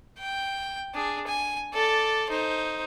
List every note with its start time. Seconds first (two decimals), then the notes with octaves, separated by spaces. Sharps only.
0.19 G5
0.94 D4 G#4
1.27 G#5
1.74 A4 D5
2.30 D#4 C5